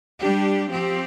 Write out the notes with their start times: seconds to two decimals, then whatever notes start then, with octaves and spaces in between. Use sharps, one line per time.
0.20 G3 D4 G4
0.69 F3 C4 G4